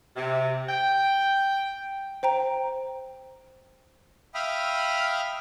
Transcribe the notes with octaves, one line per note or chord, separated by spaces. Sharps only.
C3
G5
C5 G5 A#5
E5 F5 G5 B5 D#6 F6